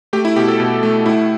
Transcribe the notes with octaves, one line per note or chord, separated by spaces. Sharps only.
A3 G4
E4
B2 G4
A4
B2
A3
A2 E4